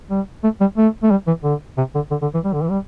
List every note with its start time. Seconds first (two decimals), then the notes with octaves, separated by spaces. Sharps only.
0.10 G3
0.44 A3
0.61 G3
0.77 A3
1.03 A3
1.11 G3
1.27 E3
1.44 D3
1.78 C3
1.95 D3
2.11 D3
2.22 D3
2.34 E3
2.44 G3
2.53 D3
2.62 E3
2.70 G3